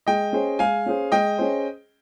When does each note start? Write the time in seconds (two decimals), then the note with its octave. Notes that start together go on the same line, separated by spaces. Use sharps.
0.07 G#3 D#5 G5
0.33 C#4 G#4 C5
0.59 G#3 F5 G#5
0.86 C#4 G#4 C5
1.12 G#3 D#5 G5
1.38 C#4 G#4 C5